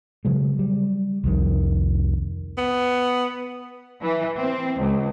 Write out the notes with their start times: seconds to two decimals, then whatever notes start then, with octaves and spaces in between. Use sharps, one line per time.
0.25 C#3 F#3 G#3
0.59 G3
1.24 C2 F2 D#3
2.58 B3
4.03 E3
4.37 C4
4.79 C#2